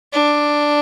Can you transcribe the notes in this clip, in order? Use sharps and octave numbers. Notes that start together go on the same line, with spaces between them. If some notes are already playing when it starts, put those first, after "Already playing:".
D4